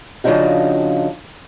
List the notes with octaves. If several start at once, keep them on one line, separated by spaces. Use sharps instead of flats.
C#3 F3 G#3 D4 D#4 F#4